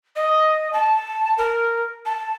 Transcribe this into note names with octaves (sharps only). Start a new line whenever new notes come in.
D#5
A5
A#4
A5